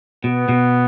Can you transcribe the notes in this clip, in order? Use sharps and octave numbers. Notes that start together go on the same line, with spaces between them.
B2 B3
B2